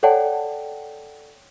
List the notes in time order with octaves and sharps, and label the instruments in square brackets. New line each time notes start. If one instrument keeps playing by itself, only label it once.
[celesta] A4 C#5 D5 F#5 G5 A5